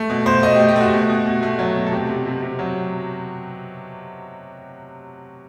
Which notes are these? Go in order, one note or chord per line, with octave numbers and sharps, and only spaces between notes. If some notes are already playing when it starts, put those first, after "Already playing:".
Already playing: A3
B2
B2 C5
A3 D#5
G4
A3
G4
A3 F#4
B2
B2
B2
A3
F#3
B2
A4
C3 G4
C3
C3
C3
F#3